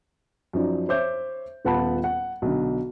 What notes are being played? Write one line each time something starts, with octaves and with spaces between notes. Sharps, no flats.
F#2 F3 D#4 D5
C5 C#5 E5 D6 G6
D#1 B3 F4 F#5 A5 B5
F#5
B1 D3